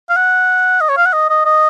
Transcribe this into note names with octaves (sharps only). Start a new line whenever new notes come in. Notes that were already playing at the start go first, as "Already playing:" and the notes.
F5
F#5
D#5
C#5
F5
F#5
D#5
D#5
D#5